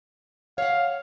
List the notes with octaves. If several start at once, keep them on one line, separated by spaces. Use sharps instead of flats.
C#5 F5 F#5